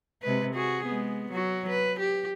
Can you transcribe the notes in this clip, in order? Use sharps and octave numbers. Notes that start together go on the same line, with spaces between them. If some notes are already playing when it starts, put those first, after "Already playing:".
C3 G#3 B4
F#4 G#4
G#3 B3
F#3 F#4
B4
G4